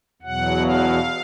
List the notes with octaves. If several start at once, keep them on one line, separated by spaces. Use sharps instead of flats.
E2 B2 F#3 F#5
F5